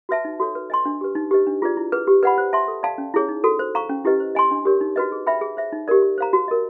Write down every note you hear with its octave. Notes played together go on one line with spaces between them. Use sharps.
F#4 B4 E5 A5
D#4
F#4 A4 C#5
B4
D#5 G#5 C6
D4
G4 B4
D#4
G4 B4 D#5
D4
F4 G#4 B4 D5
E4
G#4 B4
G4
B4 D5 F#5 B5
C5
E5 A5 C6
A4
D5 F5 A5
C#4
E4 G#4 C#5
D#4
F#4 A4
C5
F5 A#5 C#6
C#4
E4 G4 B4 D#5
C5
D#5 G#5 C6
D4
G4 A#4 C#5
D#4
F#4 B4 D#5
G#4
B4 E5 G5 B5
G#4
C5 E5
D#4
G4 A#4 D5
G4
C5 F5 A#5
F#4
A#4 D#5